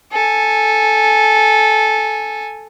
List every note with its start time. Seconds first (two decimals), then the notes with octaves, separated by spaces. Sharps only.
0.12 A4 G#5